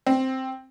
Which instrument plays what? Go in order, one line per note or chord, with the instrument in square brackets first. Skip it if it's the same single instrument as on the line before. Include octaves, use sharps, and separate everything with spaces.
[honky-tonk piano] C4